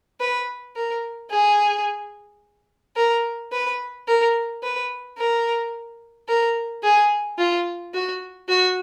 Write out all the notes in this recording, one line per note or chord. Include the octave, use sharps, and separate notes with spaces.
B4
A#4
G#4
A#4
B4
A#4
B4
A#4
A#4
G#4
F4
F#4
F#4